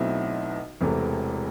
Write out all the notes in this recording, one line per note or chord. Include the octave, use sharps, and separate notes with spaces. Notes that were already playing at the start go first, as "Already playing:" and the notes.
Already playing: B1 B2 A3 C4 E4
E1 E2 C3 E3 A3